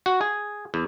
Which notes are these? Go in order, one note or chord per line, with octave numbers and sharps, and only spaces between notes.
F#4
G#4
E2